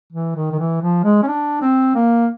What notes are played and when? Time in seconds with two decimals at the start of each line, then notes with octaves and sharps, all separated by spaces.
0.13 E3
0.36 D#3
0.52 D#3
0.59 E3
0.82 F3
1.04 G#3
1.23 C#4
1.27 D4
1.62 C4
1.95 A#3